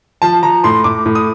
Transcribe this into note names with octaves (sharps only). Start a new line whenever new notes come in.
F3 A5
F3 A#5
A2 C6
A2 D6
A2
D#6